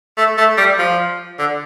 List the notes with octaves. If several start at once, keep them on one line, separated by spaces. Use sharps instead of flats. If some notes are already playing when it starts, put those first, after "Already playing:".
A3
A3
G3
F3
D3